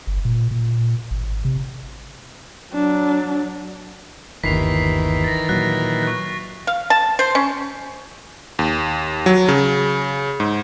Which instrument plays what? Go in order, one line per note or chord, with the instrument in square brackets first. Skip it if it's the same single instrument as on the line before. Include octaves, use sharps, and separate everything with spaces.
[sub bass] G1
A#2
A#2
G#1
C3
[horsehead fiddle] F#3 D4
[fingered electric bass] G1 D#2 [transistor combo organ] D#3 E3 [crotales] B6 C7 F7
[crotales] A6 A#6
[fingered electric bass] A#2 F#3 [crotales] F#6
[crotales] C#6 F#6
[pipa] F5
A5
C5
C#4
[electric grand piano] D#2
F#3
C#3
G#2